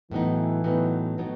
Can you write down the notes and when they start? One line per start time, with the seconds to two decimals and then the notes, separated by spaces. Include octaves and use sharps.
0.11 A2 E3 F#3 B3 D#4
0.64 A2 F#3 B3 D#4
1.18 A2 F#3 B3 D#4